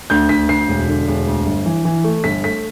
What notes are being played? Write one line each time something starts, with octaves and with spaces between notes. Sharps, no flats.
D2 G6
D2 B6
D2 C7
E1
D3
E1
D2
G1
E3
E3
A3
G1 B6
A3 B6